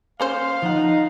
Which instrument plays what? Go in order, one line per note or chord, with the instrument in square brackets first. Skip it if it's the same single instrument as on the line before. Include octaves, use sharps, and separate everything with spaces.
[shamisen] A#3 C#4 C5 [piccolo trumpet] F5
[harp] F3 F#5 [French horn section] D#4